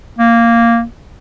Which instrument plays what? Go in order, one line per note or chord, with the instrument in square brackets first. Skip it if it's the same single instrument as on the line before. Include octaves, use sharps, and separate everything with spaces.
[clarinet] A#3